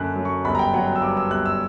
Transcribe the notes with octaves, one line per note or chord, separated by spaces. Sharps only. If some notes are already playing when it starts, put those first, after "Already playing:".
Already playing: F#1 F#2 D3 F#6
F#3
C#6
G1 B5
A#5
G5
F#3 F#5
G5
E6
G2 D6
E6
G1 F#6
E6